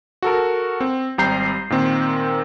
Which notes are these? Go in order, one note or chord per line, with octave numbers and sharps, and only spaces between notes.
F#4 A4 A#4
C4
G#1 G3 C4 A#5 G6 C7
A#2 D#3 C4